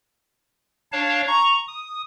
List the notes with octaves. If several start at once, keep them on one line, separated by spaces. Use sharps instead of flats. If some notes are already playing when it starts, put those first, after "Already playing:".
D4 C#5 F5 A5
A#5 C#6
D#6